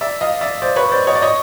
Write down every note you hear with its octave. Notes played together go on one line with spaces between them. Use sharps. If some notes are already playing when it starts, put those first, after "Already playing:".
D5 E5
D#5 F5
D5 E5
C5 D5
B4 C#5
C5 D5
C#5 D#5
D5
C#5 D#5